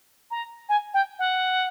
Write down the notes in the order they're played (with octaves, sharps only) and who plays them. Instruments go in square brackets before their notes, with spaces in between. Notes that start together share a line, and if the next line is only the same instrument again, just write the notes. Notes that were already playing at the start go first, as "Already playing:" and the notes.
[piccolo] A#5
G#5
G5
F#5